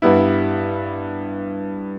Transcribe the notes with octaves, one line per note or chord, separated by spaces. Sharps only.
G2 G3 B3 E4